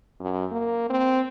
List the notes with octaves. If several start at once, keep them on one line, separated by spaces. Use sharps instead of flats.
F#2
A#3
C4